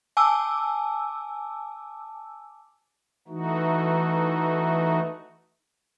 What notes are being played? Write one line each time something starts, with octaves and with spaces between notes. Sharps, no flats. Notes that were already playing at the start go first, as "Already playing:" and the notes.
G#5 A5 D6 E6
E3 A3 D#4 F#4